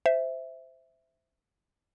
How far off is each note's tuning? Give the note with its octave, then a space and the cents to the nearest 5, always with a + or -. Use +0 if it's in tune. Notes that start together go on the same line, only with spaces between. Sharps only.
C5 -15 E5 +0